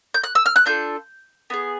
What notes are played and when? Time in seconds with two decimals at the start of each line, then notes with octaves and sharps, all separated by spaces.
0.14 G6
0.24 F#6
0.35 E6
0.46 F6
0.56 F#6
0.66 D4 F4 A4 G6
1.50 B3 D#4 G#4